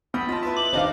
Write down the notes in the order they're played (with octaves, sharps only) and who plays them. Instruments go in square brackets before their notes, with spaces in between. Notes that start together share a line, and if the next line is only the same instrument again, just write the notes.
[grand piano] A1 D#6 G6 [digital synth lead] B3 [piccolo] B5
[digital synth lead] F4 [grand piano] D#5 A5
[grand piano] E4 B4 A5
[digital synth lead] D6 [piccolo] F#7
[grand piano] D#2 D4 D#4 [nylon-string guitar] C5 D#5 F5